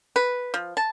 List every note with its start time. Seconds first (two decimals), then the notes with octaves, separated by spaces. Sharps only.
0.16 B4
0.54 F3
0.77 A5